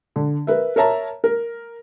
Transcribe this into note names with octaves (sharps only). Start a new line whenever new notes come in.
D3
A#4 B4 E5
A#4 C#5 E5 A5 A#5
A#4